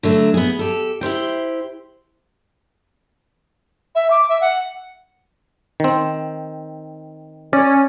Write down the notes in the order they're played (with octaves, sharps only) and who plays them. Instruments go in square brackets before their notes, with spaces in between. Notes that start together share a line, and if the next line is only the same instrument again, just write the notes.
[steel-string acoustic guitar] D3 F#3 A3
B3 G#4
G4 A4
E4 G4 C5 G5
[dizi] E5
D6
E5
F#5
[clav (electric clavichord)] D#3 C4
[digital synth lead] C#4 [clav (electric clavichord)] D5